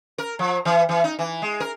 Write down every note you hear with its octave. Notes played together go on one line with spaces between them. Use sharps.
A#4
F3
E3
E3
D#4
E3
G#3
A#4